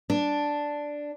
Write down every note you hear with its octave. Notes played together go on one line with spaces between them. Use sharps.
D4